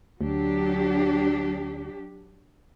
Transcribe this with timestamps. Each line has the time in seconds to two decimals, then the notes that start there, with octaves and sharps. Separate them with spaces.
0.21 D2 F#3 D4 G4